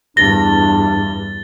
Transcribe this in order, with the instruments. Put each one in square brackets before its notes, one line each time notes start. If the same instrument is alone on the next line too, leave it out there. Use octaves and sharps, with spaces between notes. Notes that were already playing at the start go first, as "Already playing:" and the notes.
[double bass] E2 G2 [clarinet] D4 [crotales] A6 G7 [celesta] A#6